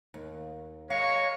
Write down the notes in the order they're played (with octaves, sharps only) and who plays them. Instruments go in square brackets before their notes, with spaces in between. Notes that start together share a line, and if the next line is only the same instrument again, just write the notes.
[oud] D#2
[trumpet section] G#3 A#4 C#6 [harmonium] C#5 [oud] F5